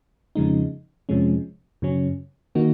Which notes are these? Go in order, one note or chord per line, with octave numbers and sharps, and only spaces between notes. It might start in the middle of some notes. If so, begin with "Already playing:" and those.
F2 C#3 F3 G#3 D#4
F2 C3 F3 G#3 C#4
F#2 C#3 F#3 C#4
D#3 A#3 D#4 F#4